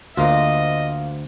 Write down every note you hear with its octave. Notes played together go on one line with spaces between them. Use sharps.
D2 A#3 F4 D#5